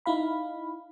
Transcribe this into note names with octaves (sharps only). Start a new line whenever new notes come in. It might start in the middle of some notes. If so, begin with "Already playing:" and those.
D#4 E4 F5 B5